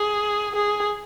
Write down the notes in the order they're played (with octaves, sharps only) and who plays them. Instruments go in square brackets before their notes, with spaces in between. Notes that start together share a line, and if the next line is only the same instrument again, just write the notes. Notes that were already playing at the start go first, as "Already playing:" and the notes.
Already playing: [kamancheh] G#4
G#4